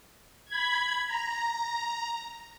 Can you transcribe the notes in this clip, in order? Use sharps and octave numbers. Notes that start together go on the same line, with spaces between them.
B5 G#6
A#5